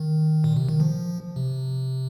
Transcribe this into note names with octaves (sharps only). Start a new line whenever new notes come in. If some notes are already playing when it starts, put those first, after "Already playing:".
Already playing: D#3
A#2
C3
D#3
F3
C3